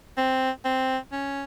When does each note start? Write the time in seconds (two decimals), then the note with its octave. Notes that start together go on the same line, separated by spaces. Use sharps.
0.17 C4
0.65 C4
1.12 C#4